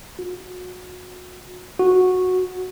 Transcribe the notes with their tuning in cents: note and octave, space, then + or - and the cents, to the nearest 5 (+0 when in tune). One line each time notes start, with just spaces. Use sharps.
F#4 -30
F#4 -10